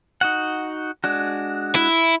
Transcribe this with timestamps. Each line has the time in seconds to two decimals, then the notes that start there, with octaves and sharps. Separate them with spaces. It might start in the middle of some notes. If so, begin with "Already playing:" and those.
0.21 D#4 F#4 F#5
1.04 G#3 D4 F#4
1.75 E4